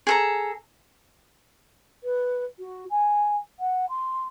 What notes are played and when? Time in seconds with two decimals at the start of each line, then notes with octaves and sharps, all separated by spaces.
0.07 G#4 A4 A#5
2.03 B4
2.59 F#4
2.90 G#5
3.59 F#5
3.89 C6